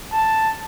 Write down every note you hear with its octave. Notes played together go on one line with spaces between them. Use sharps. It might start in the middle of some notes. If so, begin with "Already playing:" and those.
A5